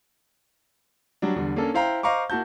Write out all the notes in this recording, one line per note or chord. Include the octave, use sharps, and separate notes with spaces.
F#3 G3 D4
E2 D3 G3
A#3 C#4 D4 A4
E4 C5 F5 G5 A#5
C5 D#5 F5 A#5 C#6 D6
A#3 E4 F#4 A5 G6